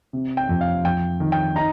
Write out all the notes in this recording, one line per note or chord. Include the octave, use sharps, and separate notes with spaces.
C3
G5
F2
F5
F2 G5
D#3
G5
D#4 A#5